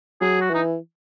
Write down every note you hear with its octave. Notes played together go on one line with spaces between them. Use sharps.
F#3 G#4
F#4
E3 D#4